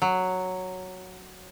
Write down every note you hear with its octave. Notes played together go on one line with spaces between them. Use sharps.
F#3